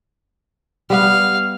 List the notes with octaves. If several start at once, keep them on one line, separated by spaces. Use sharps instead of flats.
G3 B3 F5